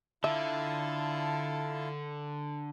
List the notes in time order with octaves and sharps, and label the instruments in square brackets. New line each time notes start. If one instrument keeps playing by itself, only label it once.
[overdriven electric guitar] D3 [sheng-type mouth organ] E4 F4 A5 [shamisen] E5